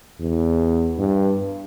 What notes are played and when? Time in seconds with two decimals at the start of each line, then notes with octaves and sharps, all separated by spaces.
0.20 E2
0.99 G2